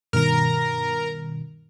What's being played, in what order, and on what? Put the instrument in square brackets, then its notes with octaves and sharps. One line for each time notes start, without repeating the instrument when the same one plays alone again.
[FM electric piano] G2 B2 D#3 [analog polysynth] A#4 A#5